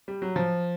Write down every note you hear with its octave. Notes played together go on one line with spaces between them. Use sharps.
G3
F#3
F3